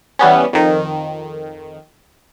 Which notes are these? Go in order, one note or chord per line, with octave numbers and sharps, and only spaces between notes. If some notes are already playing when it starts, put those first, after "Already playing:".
E3 G3 B3 C#4
F2 D#3